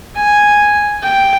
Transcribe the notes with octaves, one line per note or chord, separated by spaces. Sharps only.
G#5
G5